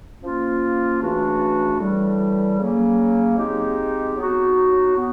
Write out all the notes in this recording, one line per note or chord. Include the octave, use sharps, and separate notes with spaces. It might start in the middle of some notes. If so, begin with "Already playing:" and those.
F3 A#3 C#4 F4
C#3 E3 A3 D4 F#4
A2 E3 G3
C#3 F#3 A#3 C#4
G#3 C4 D#4 G4
F#3 B3 D#4 F#4
B3